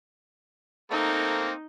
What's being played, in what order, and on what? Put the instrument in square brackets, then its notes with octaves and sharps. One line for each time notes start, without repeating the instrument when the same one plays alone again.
[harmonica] A3 A#3 C4 [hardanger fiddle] D#4